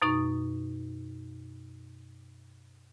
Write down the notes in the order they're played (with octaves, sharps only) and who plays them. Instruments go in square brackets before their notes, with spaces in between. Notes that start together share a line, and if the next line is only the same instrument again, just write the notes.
[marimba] F#2 B2 D#4 C#6